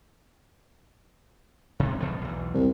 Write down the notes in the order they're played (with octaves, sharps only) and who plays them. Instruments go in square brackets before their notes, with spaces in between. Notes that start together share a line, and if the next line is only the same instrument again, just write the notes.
[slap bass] C3 D#3 G#3
B2 F3 A3
B1 E2
[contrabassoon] C2